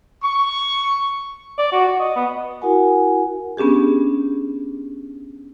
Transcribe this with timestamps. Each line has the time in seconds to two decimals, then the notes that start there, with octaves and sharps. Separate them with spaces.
0.23 C#6
1.58 D5
1.72 F#4
1.88 F#4
1.99 D#5
2.16 B3
2.62 E4 F#4 A#4 F#5 G#5
3.57 B3 C#4 D4 G4 G#4